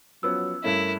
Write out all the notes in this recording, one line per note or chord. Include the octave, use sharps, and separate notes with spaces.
F3 F#3 B3 C#4 E6
G2 A3 C#4 E4 A#4